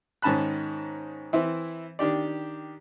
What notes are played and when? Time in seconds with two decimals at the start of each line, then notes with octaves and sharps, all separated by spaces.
0.22 G#2 D#3 C#4 A5 B5 F#6
1.33 E3 C4 E4
1.99 D#3 D4 G4 D5